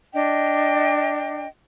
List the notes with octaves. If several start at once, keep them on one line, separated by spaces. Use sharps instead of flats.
D4 D#5 G5